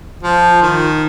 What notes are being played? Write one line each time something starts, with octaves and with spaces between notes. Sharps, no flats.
F3
D#3